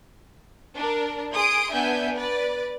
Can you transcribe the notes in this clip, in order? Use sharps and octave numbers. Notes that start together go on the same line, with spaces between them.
D4 A#4
G#4 C6 D#6 D7
B3 D4 E5 G#5 G6
B4 D5 A6